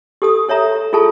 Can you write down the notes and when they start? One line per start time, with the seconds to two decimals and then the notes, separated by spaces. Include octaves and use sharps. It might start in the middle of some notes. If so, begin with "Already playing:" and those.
0.22 G4 A4 D#6
0.49 A4 C#5 E5 A#5
0.93 F4 G#4 A4 A5